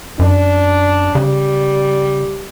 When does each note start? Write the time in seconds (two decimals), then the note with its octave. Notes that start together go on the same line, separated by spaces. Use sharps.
0.19 F#2 D4
1.15 C#3 G3